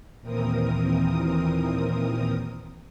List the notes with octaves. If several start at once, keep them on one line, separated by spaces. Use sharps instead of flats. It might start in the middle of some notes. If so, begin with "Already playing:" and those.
D#2 A#2 E3 C4 A#4 D#6